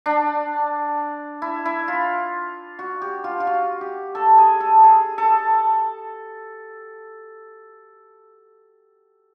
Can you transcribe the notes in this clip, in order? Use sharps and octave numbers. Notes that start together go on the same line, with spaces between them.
D4
E4
E4
F4
F#4
G4
F4
F4
F#4
G4
A4
G#4
A4
G#4
A4